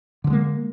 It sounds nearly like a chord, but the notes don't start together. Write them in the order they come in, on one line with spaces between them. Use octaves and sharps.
D3 E3 G#3 A#3